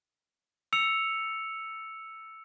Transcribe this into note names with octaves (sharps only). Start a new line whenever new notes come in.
E6 C#7 F7